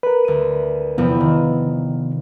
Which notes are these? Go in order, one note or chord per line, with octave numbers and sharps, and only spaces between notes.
A#4 B4 F#6
D2 D#7
E2 C3 F3 B3
D#3